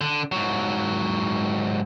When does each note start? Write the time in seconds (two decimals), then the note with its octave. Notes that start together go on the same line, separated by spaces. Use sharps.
0.01 D3
0.32 G#2 F#3